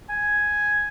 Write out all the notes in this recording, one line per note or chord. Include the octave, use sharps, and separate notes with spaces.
G#5